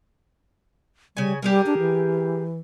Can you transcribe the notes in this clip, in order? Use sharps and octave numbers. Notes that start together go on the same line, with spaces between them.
C#3 G3 G#5
G3 G4 G#4 A#4
D4
E3